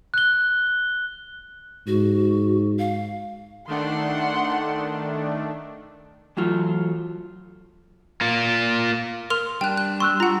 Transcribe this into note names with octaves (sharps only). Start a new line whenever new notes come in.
F#6 G7
G#2 F#4
F5
D#3 A3 D4 F#5 C6
E3 F#3 A3 F4
A#3 F4
A#4 C6 F6 F7
G3 D4 G5 F#6
F#6
C6 C#6 E6 F#6
F4 F#5 A#5